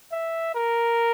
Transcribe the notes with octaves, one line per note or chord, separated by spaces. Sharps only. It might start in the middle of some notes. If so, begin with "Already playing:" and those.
E5
A#4